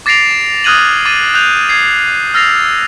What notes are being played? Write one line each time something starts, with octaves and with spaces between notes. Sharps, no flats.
D6 A6 A#6 C7 D7 F7
D#6 F6 F#6 G#6 D#7 F#7
D6 A6 D#7
F#6 G6 F7
G#6 C7
E6 F6 A6 A#6 C7 F7